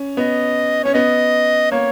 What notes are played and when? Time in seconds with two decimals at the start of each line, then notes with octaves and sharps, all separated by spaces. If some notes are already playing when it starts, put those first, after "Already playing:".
Already playing: C#4
0.17 B3 D#5
0.84 C#4 C#5
0.94 B3 D#5
1.72 A#3 C#5